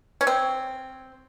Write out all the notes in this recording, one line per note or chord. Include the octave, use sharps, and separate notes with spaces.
C#4
C4